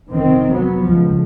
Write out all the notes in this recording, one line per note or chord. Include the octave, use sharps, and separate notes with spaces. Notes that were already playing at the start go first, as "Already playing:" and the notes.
F1 D#3 C4
F#3 B3
C#2 F3